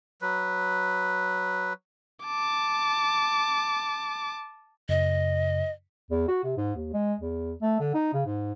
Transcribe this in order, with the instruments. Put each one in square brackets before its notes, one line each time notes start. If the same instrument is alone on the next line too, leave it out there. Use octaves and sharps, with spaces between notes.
[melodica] F#3 B4
[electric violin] A5 D6
[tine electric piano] F#2 C#3 [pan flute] D#5
[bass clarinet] E2
F#4
C3
G#2
D#2
G#3
E2
A3
D3
D#4
C#3
G#2